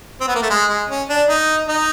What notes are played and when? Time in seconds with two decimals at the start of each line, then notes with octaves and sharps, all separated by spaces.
0.21 C4
0.28 B3
0.35 A#3
0.42 A3
0.50 G#3
0.69 G#3
0.89 C#4
1.09 D4
1.29 D#4
1.68 D#4